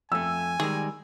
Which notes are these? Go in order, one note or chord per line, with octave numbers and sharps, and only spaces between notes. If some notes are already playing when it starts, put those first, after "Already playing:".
F2 A3 G#5 E6
D#3 G3 G#3 G#4